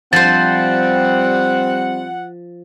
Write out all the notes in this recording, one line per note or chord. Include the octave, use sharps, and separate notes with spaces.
F3 G3 C4 C5 F#5 A6